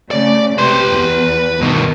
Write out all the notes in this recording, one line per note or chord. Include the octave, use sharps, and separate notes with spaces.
C#3 A3 D5
C3 G4 B4 C6
E2
G2 B2 D#3